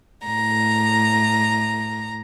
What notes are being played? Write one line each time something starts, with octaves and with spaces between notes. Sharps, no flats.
A2 A#5